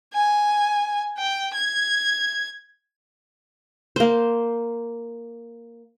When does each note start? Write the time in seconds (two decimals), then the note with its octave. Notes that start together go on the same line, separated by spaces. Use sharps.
0.14 G#5
1.18 G5
1.55 G#6
3.96 A#3 C5